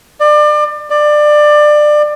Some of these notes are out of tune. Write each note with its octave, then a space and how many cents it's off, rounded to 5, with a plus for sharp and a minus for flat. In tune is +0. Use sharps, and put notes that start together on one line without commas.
D5 +30
D5 +20